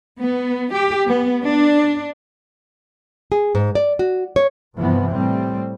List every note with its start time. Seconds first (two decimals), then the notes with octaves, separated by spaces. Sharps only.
0.19 B3
0.72 G4
1.07 B3
1.43 D4
3.32 G#4
3.55 G#2
3.75 D5
3.99 F#4
4.36 C#5
4.77 G2 C3 E3 F3 B3
5.12 A2 G3 C4